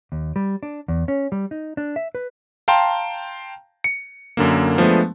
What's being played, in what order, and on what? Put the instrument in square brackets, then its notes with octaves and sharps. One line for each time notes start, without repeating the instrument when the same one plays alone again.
[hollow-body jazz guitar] D#2
G3
D4
E2
C#4
G3
D#4
D4
E5
B4
[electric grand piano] F5 G5 A5 A#5 C6
C#7
F#2 D3 A#3
F3 G#3 A3 B3 D4